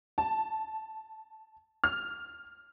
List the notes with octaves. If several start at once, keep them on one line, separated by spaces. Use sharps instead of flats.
A5
F6